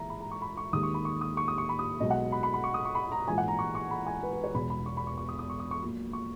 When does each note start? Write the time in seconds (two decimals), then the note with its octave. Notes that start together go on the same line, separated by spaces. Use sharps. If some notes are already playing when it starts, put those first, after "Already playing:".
Already playing: A#1 G#2 E3 E5 A#5
0.10 B5
0.20 A#5
0.31 C#6
0.42 B5
0.57 C#6
0.73 D#2 D#3 G#3 D#6
0.83 C#6
0.94 B5
1.05 C#6
1.21 D#6
1.37 C#6
1.48 D#6
1.58 C#6
1.69 B5
1.79 D#6
2.00 B1 B2 G#3 D#5
2.11 F#5
2.32 B5
2.43 B5
2.54 B5
2.64 C#6
2.74 D#6
2.85 C#6
2.95 B5
3.12 A#5
3.27 A#1 G#2 E3 G#5
3.38 F#5
3.48 A#5
3.59 C#6
3.75 C#6
3.91 B5
4.07 G#5
4.23 B4
4.33 B4
4.44 C#5
4.54 E1 E2 B2 B5
4.70 B5
4.86 C#6
4.97 B5
5.07 C#6
5.18 C#6
5.29 D#6
5.39 D#6
5.50 C#6
5.60 D#6
5.71 C#6
5.82 A#1 A#2 F#3 A#3
6.13 C#6